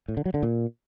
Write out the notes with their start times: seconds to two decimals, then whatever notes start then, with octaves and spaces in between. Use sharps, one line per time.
0.08 A2
0.17 D3
0.26 F#3
0.34 D3
0.43 A#2